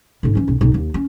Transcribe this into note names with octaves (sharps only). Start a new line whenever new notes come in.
G#2 D3
E3 C#4
B1
B1 D#4
D#2
C#4